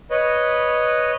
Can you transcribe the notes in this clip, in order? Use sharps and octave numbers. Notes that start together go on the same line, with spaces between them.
B4 C#5 D#5